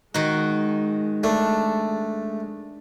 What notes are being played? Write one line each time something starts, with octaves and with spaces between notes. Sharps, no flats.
D#3 G#3 F#4
A3 D4